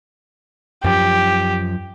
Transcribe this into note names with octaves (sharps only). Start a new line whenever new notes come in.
F#2 F3 G4